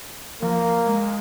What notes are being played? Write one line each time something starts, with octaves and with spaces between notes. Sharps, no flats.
F3 A#3
G#3